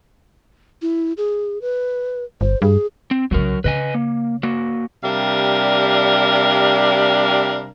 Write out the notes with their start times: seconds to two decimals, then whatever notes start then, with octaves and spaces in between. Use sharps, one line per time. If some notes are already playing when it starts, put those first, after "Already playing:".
0.82 E4
1.17 G#4
1.62 B4
2.41 G1 C5
2.62 G2 G#4
3.11 C4
3.31 C2 C#3 F#3 F#4 A#4
3.64 C#3 B4 D#5 G#5
3.94 A#3
4.43 A#3 F#4
5.04 C3 G3 D4 A#4 F5